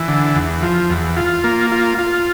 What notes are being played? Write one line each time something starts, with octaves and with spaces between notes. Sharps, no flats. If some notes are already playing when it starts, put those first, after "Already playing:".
Already playing: E3
D3
E2
F3
E2
F4
A#3
F4
F4